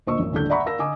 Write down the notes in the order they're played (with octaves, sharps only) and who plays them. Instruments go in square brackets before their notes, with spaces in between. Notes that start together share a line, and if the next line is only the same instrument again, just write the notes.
[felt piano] D2 A#2 C5 D#5 C#6 E6
A1 F#2
D#1 A2 D3 D4 A4 G6
D5 E5 F#5 A#5 B5 C#6
A#4 F5 E6 A#6
D3 D#5 G#5 D6 D#6